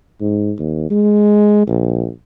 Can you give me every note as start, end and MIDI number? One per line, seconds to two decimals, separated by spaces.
0.20 0.52 44
0.59 0.89 39
0.90 1.62 56
1.67 2.07 34